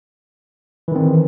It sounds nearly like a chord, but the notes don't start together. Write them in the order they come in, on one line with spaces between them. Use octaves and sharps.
E3 D#3 C4